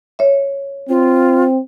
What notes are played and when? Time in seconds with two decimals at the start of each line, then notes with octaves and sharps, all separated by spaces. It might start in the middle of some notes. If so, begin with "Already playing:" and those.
0.19 C#5 E5
0.89 C4 F4